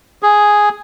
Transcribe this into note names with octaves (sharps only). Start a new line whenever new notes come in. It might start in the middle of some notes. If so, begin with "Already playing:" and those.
G#4